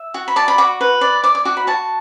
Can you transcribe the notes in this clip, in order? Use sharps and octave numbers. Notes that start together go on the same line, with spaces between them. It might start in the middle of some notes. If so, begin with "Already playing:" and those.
Already playing: E5
F#4
B5
D5 A5
B5
F#4 D6
B4
D5
D5 D6
D6
F#4 D6
B5
F#4 A5